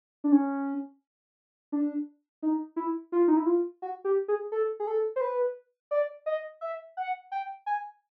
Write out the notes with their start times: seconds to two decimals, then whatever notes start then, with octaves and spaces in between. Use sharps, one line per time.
0.24 D4
0.32 C#4
1.72 D4
2.43 D#4
2.76 E4
3.12 F4
3.28 D#4
3.37 E4
3.46 F4
3.82 F#4
4.05 G4
4.28 G#4
4.52 A4
4.80 G#4
4.87 A4
5.16 C5
5.21 B4
5.91 D5
6.26 D#5
6.61 E5
6.97 F#5
7.32 G5
7.66 G#5